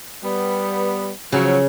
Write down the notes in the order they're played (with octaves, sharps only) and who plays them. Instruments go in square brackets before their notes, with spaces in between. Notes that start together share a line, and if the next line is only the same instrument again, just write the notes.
[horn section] G3 B3
[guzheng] C#3 [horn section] F3 F#3